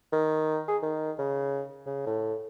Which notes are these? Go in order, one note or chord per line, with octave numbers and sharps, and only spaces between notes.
D#3
G#4
D#3
C#3
C#3
A2